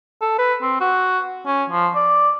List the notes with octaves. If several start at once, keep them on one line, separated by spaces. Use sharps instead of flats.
A4
B4
C4
F#4
C#4
F3
D5